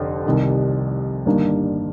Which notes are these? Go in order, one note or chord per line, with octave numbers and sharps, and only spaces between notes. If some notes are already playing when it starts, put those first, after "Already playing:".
Already playing: F1 F2 D3
C2 C3 D#3
G1 G2 D#3 A#3 D4